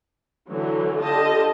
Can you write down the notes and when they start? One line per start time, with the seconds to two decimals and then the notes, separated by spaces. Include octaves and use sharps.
0.49 D3 E3 F#3
1.00 D3 F4 G4 D#5 A5